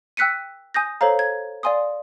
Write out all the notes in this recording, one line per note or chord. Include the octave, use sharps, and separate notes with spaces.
G5 E6 F#6 B6 C#7 D#7
G#5 D#6 G6 A#6
A4 C5 C#5 F5 A#5
G#6
D5 F5 G#5 C6 D#6